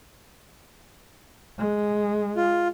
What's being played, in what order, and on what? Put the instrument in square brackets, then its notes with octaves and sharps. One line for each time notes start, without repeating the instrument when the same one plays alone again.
[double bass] G#3
[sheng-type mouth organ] F4